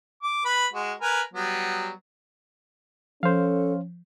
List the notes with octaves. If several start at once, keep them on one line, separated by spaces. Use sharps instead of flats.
D6
B4 B5
G#3 F#4
A#4 B4 G#5
F#3 G3 B3
F3 C#4 A4 C5 F5